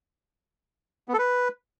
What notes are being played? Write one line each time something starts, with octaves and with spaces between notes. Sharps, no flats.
B3
A4
B4